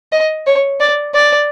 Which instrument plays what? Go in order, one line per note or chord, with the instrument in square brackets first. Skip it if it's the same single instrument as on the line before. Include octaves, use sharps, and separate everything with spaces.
[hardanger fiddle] D#5
C#5
D5
D5